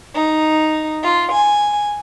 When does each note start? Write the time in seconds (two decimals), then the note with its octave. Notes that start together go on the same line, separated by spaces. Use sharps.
0.13 D#4
1.02 F4
1.32 G#5